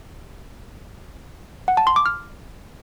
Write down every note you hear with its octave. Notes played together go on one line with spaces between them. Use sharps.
F#5
A5
C6
D6
F6